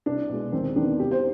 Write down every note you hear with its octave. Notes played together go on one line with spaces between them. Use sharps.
C2 D4
B2 G#3
D#2 C4
D#3 B3 D4
C2 G4
C5